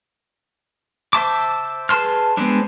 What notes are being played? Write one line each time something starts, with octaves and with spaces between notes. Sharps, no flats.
C5 E5 A5 D6
G#4 B4 A5 C6 F6
G#3 B3 C4 D4